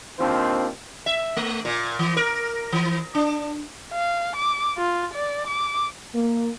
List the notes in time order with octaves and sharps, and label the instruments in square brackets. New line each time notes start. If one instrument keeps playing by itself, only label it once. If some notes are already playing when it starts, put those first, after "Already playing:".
[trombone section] D#2 D#3 C4 D4 F4 C5
[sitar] E5
A3
A#2
E3
A#4
E3
D4
[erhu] F5
D6
F4
D5
D6
[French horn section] A#3